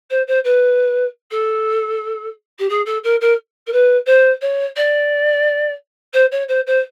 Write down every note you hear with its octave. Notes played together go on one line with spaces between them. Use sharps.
C5
C5
B4
A4
G4
G#4
A4
A#4
A#4
A#4
B4
C5
C#5
D5
C5
C#5
C5
C5